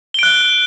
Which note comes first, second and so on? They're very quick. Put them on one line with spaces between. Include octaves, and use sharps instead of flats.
G7 D7 F#6